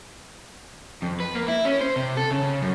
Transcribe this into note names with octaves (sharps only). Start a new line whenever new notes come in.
F2
B4
A#3
E4
C#4
C5
C3
A4
C#3
C#3
F#2